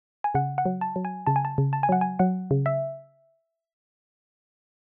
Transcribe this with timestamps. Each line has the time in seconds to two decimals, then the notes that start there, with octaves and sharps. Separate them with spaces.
0.24 G#5
0.34 C#3 F#5
0.58 F#5
0.66 F#3
0.81 A5
0.96 F#3
1.05 G#5
1.27 C#3 A5
1.36 G#5
1.45 A5
1.58 C#3
1.73 A5
1.83 G#5
1.89 F#3 F#5
2.01 G#5
2.19 F#3 F#5
2.51 C#3
2.66 E5